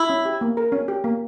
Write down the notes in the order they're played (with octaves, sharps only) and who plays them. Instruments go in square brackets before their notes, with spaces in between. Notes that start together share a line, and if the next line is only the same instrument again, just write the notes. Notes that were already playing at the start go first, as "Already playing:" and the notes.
Already playing: [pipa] E4
[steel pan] C#4
G4
A#3
A#4
C#4
G4
A#3